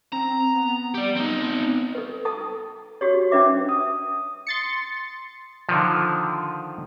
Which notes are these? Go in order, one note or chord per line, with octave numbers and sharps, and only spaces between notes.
C4 A#5
B3
G4 D5
C4 D#4
A4 B4
A4 A5 D#6
F#4 G4 C#5
C#4 D4 B4 E5 D6
D#6
C6 A6 C#7
D3 D#3 F3